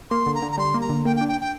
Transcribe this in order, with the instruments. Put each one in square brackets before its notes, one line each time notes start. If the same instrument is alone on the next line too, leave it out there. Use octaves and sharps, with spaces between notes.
[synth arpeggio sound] A#3 [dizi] C6
[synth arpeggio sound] D3
[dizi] A#5
[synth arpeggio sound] D3
[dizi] A#5
[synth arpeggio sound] G3 [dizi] C6
[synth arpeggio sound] A#3
[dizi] A#5
[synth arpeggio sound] D3
[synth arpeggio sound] A#3 [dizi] G5
[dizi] G5
[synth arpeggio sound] D4
[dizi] G5
G5